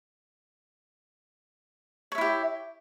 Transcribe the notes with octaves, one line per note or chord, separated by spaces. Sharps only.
E4 G4 C#5 E5